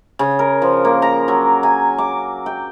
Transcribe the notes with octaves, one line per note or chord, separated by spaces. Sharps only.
C#3
A#4
F3
A#3
A#5
F#3
G#5
D6
G5